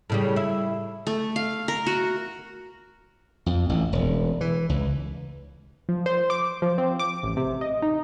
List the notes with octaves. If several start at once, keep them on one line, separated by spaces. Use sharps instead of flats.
A2 C#3 G3
E4
A3
F5
A#4
F#4
F2
A1
E1
E3
C#2
F3
C5
D6
F3
C4
D6
A1
C3
D#5
D#4